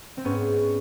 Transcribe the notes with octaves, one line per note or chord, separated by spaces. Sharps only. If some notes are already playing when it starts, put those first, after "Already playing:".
C4
G#2 B3 C#4